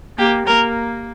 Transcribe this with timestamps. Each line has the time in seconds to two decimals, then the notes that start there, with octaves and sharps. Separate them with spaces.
0.18 A#3 G4
0.47 A#3 A#4